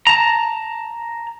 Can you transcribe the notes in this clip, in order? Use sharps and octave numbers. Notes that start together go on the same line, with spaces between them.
A5 A#5